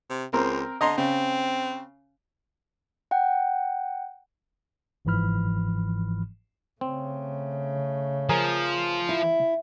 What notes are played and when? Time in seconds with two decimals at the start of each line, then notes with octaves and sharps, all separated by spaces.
0.10 C3
0.33 C#2 C4 A#4 C5
0.81 D3 D#5 A#5 C6
0.98 C#3 C4
3.11 F#5 G5
5.05 G1 G#2 E3 F3 B5 F6
6.81 C#3 A3 C4
8.29 F3 G#4 A#4
9.09 E4